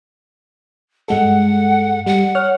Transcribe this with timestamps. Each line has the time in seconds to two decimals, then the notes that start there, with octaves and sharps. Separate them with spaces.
1.08 G2 G#3 A4 F#5
2.06 G3 F#5
2.35 C#5 F6 F#6